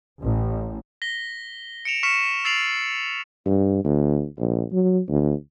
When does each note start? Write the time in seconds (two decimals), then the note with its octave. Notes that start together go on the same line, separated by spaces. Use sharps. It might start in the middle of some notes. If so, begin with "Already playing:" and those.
0.21 A1
1.02 A#6 B6 G7
1.85 C#7 D7 E7 F7
2.03 C#6 F6 B6 C#7 E7
2.45 E6 A6 C7 D7 F7 F#7
3.46 G2
3.84 D2
4.39 A#1
4.72 F#3
5.09 D2